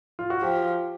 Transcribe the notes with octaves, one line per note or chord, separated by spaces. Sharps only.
F4
F#4
F3 G4